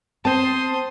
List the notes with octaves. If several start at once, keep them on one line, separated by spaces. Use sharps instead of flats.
C4 C5 A5 C6 D#6